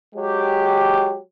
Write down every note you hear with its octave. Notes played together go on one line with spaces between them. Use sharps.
F#3 G#3 G4